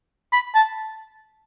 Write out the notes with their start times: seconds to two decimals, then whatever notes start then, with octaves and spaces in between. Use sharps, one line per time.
0.32 B5
0.55 A5